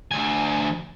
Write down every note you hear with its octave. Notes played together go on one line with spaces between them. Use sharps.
D2 G#5